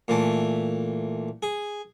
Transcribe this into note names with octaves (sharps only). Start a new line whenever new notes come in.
A#2 E3 A3
G#4